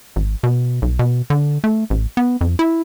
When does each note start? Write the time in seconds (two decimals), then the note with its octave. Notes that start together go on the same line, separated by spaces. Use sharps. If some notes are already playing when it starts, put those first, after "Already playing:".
0.16 G#1
0.43 B2
0.82 B1
0.99 B2
1.30 D3
1.64 A3
1.90 A1
2.17 B3
2.41 F2
2.59 E4